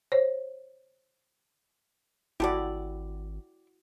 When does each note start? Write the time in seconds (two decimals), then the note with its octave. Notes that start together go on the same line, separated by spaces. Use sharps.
0.12 C5 C#5
2.40 G#1 E4 F#4 G4 A4 D5